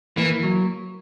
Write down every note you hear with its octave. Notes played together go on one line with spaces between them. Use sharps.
E3 A#3
F#3